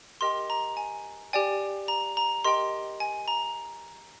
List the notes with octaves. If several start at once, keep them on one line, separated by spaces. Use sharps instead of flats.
G4 A#4 D#5 G5 C6
A#5
G#5
G4 D5 G5 G#5
A#5
A#5
G4 A#4 D#5 G5 C6
G#5
A#5